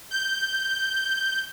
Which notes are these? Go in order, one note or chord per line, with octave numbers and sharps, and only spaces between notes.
G6